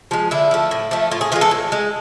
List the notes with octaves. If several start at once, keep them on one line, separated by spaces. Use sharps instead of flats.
F3 G#3
D3 E4
F3 A3
A2
F3 A3
A2 F4
G#4
E3 G#3 F4
A4
A2
G#3